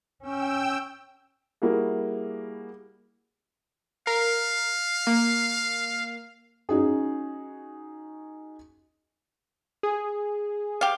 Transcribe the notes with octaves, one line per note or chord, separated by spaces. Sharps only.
C#4 G5 E6
G3 A#3 E4 F#4 G#4
A#4 F5
A#3
C#4 D#4 F#4 G#4
G#4
G4 F5